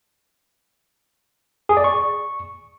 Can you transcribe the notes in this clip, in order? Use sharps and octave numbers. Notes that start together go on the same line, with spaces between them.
G#4
D5
C#6